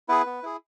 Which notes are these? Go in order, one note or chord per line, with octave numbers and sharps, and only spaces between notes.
B3 E4 G#4 B4
B3
E4 G#4